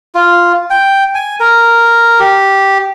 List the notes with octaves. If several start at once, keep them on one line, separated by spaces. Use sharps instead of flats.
F4
G5
G#5
A#4
G4